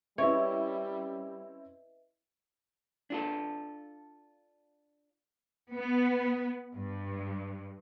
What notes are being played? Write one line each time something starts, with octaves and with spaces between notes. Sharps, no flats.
G3 C4 C#4 E4 B4 C#5 D#5 E5
D4 F4 A4
B3
G2